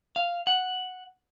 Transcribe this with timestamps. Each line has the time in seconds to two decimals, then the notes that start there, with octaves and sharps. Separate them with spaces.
0.16 F5
0.47 F#5